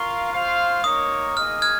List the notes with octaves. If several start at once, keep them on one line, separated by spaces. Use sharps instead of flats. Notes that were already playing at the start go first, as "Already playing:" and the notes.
Already playing: F4 A#4 F5 C#6
F4 C5 F5
A#3 D#4 A#4 C#5 D#6
A#3 D#4 G#4 D#5 F6
F6 G#6